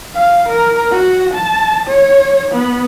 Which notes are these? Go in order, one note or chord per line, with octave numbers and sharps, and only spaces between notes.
F5
A#4
F#4
A5
C#5
B3